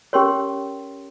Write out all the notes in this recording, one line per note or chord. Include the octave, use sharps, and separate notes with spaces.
C#4 G4 A#4 C#5 C6